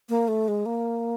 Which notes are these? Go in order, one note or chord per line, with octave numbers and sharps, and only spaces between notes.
A#3
A3
G#3
A#3